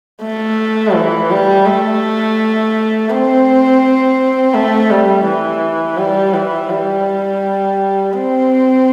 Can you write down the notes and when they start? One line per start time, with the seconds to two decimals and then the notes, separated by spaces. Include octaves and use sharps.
0.22 A3
0.95 E3
1.31 G3
1.66 A3
3.10 C4
4.54 A3
4.90 G3
5.26 E3
5.98 G3
6.34 E3
6.70 G3
8.14 C4